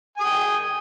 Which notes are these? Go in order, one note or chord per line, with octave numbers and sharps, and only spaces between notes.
G5 G#5 D#6